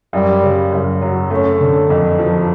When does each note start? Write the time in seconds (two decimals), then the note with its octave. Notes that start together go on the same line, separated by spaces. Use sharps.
0.13 F#2 G3
0.43 C#3
0.73 F#2
1.02 F#3
1.30 A3 C#4
1.61 D3
1.90 F2
2.19 F3